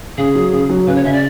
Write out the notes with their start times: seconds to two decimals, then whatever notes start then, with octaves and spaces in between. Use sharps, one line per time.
0.18 C#3 G#4
0.35 F#3
0.53 C#3
0.69 F#3
0.87 C#3 B4
0.96 C#5
1.04 C#3 E5
1.13 D5